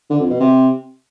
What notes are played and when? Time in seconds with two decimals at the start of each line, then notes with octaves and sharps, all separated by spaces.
0.10 D3
0.20 F2
0.30 B2
0.40 C3